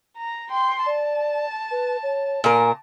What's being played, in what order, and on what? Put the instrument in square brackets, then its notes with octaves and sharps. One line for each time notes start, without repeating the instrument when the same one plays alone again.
[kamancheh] A#5
G5 C6
[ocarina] D5 [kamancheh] A5
[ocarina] B4
C#5
[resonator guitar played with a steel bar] A#2 A#4 [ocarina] G#5